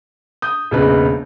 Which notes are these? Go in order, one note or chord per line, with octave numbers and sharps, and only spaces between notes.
D#6 G6
E1 A#1 C#3 D#4 B4